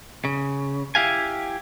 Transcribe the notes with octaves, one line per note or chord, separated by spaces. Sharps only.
C#3
E4 G4 F5 G#5